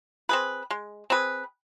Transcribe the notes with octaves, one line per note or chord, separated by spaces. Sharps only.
C4 G#4 B4
G#3
C4 G#4 B4